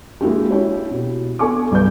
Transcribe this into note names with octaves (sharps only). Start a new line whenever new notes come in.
G#3 A#3 E4 F#4 G4
E4 G4 C#5
B2
B3 A4 G#5 C#6 D6
C2 G2 B4 G6